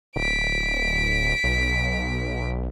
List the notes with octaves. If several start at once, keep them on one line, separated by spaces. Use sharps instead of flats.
D1 B6 D7
B1